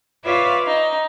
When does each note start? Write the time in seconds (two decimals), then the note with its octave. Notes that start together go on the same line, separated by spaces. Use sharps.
0.24 F4 B4 C#5 D5 E5 F5
0.65 D#4